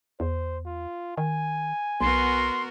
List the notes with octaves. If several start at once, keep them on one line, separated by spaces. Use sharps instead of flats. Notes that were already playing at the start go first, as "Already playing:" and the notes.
E2 C5
F4
D#3 G#5
B1 B3 F#4 A#4 C6